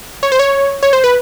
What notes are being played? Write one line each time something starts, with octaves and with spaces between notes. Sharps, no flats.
C#5
C5
C#5
C#5
C5
B4